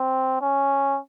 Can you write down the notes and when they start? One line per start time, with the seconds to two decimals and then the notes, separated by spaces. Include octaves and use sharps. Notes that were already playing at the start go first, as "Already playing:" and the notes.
Already playing: C4
0.41 C#4